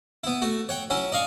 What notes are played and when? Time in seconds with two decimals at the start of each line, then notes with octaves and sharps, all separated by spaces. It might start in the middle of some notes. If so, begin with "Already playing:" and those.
0.24 B3 E4
0.42 A3 F#4
0.69 C#5 F#5 G5
0.90 F#3 C#4 E4
1.12 D5 D#5 F5 C#6